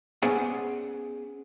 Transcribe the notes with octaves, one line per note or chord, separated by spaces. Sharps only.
B3 C#4 G#4 C5 D5 F#5